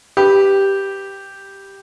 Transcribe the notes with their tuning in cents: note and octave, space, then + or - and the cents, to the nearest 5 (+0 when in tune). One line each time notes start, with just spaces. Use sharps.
G4 +0 B4 +0